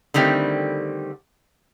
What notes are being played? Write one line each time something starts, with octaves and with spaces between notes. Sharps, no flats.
D3 D#3 G3 A3 C4